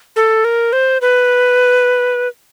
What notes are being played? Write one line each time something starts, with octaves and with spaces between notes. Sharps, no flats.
A4
A#4
C5
B4